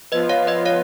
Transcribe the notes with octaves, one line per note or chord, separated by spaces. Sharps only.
F3 B3 F4 B4 D#5
C#5 F5
B4 D#5
C#5 F5